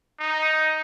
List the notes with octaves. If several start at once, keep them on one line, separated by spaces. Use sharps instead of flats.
D#4